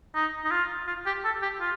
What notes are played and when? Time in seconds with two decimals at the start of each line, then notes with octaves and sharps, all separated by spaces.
0.15 D#4
0.45 D#4
0.51 F4
0.87 F4
1.06 G4
1.25 A4
1.42 G4
1.60 F4